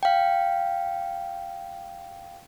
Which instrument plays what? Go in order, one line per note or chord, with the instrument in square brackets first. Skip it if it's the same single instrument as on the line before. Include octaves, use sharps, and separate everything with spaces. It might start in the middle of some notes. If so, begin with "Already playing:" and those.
[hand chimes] F5 G5